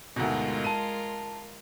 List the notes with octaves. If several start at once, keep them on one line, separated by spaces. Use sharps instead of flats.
D2 G#2 B2 G#3 F4 A#4
A5 D#7